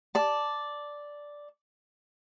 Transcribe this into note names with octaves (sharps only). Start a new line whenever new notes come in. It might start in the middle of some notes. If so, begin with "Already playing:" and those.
D5 A5